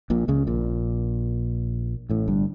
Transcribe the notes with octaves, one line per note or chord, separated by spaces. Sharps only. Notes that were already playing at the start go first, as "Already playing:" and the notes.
A#1 A#2
C#2 C#3
A#1 A#2
A1 A2
G1 G2